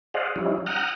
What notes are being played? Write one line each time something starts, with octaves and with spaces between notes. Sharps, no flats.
G#4 C5 D5 D#5 F5 F#5
F3 G3 C#4 D#4 E4
F#5 G5 A#5 D#6 F6 F#6